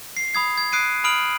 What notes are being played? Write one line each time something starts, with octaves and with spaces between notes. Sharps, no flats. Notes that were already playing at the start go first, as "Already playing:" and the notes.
C7
B5 D#6 G#6 C7
G#6
D#6 F#6 C7 D7 D#7
B5 D#6 F6 D7 F#7